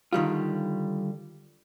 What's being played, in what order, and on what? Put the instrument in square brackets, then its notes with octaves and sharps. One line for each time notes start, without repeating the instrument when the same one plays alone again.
[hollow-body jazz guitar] D3 D#3 G3 F4